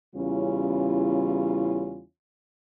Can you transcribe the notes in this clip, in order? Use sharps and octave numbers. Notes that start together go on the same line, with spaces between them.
E2 C#3 G3 C#4 E4 F4